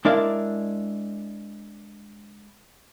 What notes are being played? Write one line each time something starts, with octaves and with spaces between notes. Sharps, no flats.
G#3 D4 E4 A#4 D5 F5